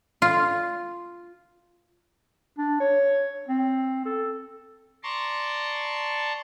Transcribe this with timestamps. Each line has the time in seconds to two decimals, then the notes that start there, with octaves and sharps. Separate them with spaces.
0.22 F4
2.58 D4
2.80 C#5
3.48 C4
4.05 A4
5.03 D5 A5 A#5 C6 C#6